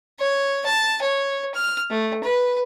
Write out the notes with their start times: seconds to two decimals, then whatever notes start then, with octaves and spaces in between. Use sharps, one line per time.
0.19 C#5
0.66 A5
1.02 C#5
1.55 F6
1.91 A3
2.23 B4